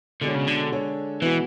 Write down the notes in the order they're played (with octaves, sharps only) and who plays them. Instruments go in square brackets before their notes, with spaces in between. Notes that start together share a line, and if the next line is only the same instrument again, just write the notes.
[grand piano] B2 G#3 D4 F#4 C#5 [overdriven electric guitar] D3
[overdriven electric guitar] C#3
D3
[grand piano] D3 G#3 D4 A4 C#5
[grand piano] B2 G#3 B3 F#4 [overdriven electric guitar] E3